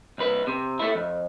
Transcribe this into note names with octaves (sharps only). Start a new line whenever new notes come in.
C2 B4
C3
A3 E4
F2